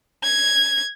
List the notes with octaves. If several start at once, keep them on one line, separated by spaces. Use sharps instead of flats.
G#6